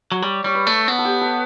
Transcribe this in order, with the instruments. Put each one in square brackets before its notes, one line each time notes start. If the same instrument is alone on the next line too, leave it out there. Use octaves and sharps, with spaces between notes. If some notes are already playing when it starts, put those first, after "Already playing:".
[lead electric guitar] F#3
[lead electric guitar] G3 [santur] C#5
[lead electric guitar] G3 [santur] C#5
[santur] B4
[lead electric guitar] A3
[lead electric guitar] B3 [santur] A4
[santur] A4
G4
A4